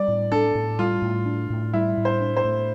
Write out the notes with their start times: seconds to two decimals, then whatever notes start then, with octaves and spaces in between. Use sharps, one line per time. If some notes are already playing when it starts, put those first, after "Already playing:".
Already playing: G3 D5
0.08 A2
0.32 D4 A4
0.55 A2
0.79 G3 F4
1.02 A2
1.26 D4
1.50 A2
1.74 G3 E4
1.97 A2
2.05 C5
2.21 D4
2.37 C5
2.45 A2